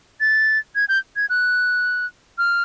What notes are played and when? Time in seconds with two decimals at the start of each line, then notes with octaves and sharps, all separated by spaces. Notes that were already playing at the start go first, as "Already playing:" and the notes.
0.21 A6
0.76 G#6
0.89 G6
1.16 G#6
1.30 F#6
2.38 F6